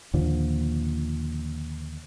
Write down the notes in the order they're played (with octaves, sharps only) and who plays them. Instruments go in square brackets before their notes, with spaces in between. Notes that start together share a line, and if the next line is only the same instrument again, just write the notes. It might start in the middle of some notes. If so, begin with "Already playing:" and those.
[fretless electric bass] D#2 A#2 D3 F3